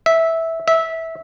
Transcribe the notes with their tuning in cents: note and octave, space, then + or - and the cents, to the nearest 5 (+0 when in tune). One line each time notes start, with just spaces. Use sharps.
E5 -10
E5 -15